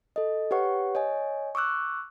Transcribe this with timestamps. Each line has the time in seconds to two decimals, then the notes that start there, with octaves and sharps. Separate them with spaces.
0.16 A4 D#5
0.51 G4 B4 C#5 F#5 C#6
0.95 C#5 D#5 G#5
1.55 C#6 D6 E6 F#6